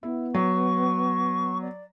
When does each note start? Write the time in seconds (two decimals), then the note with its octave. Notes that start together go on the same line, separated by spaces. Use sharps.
0.03 B3 E4
0.34 F#3 C#6
1.61 D5